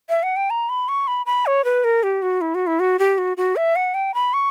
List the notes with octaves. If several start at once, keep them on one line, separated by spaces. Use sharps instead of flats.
E5
F#5
G5
A#5
B5
C#6
B5
B5
C#5
B4
A#4
G4
F#4
E4
F#4
E4
F#4
G4
F#4
F#4
E5
F#5
G5
B5
C#6